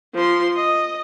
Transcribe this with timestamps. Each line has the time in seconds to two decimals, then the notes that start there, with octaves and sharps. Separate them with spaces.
0.14 F3 C6
0.55 D#5